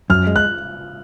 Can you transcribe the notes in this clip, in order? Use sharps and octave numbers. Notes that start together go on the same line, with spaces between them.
F#2 F6
G#3
F#6